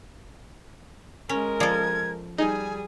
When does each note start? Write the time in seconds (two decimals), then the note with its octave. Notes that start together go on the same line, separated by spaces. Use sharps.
1.29 G#3 C#4 A#4
1.60 F3 A4 D5 G#6
2.38 G3 D#4 G#4 G#5